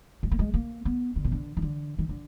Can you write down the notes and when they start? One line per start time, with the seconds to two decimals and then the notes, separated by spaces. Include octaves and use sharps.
0.23 G#3
0.32 A#3
0.39 G#3
0.54 A#3
0.85 B3
1.16 D3
1.24 B2
1.32 D3
1.57 D#3
1.62 D3
1.99 D#3
2.09 D3